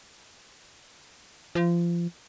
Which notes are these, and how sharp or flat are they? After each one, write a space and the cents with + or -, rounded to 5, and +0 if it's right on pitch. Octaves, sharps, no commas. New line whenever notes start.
F3 -25